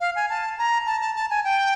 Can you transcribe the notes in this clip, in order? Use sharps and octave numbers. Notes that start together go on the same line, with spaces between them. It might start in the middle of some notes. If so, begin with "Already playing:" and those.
F5
G#5
A5
A#5
A5
A5
A5
G#5
G5